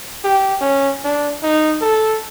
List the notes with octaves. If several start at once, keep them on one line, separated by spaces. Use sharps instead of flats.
G4
C#4
D4
D#4
A4